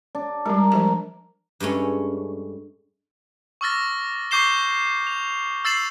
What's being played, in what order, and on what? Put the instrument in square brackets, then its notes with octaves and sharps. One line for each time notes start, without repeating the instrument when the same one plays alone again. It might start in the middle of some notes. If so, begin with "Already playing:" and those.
[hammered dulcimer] D4
[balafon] G3 G#3 [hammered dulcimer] A#4
[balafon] F3 G#3 A#5
[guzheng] G2 G#3 A3 C#4
[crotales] C#6 D6 E6 F6 A6 A#6
C#6 D6 G6 C7 E7 G7
F7
E6 A6 C7 E7 F#7